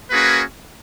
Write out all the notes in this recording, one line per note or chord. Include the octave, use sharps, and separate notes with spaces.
A#3 C#4 F#4 G#4 B4